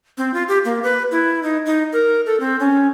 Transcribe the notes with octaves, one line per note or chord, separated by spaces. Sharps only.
C4
F4
G4
A#3
B4
E4
D#4
D#4
A#4
A4
C4
C#4